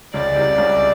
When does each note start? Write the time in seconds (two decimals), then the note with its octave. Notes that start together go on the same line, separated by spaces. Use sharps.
0.14 C#2 C#3 D5
0.36 C2 C3
0.58 C#2 C#3